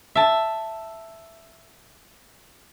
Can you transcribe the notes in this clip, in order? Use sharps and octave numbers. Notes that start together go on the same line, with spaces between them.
E5 A5